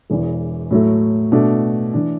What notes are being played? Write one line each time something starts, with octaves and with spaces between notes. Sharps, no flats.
E1 E2 E3
A2 F#3 A3
B2 A3 D4
E3 D4